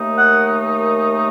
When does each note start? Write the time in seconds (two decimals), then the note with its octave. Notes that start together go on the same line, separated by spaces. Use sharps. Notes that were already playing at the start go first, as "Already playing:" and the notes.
Already playing: D#2 D#3 A3 D#4
0.18 F#5